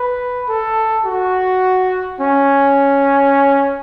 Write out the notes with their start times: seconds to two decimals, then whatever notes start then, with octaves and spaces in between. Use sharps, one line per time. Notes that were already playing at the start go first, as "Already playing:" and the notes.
Already playing: B4
0.49 A4
1.06 F#4
2.20 C#4